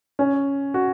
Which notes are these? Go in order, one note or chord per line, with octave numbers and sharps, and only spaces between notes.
C#4
F#4